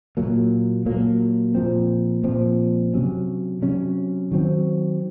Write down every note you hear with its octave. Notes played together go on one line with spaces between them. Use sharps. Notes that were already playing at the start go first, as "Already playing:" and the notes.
A#2 F#3 A#3
A#2 F#3 A#3
A#2 F3 C4
A#2 F3 C4
C3 F#3 C#4
C3 F#3 C#4
D#3 F#3 C4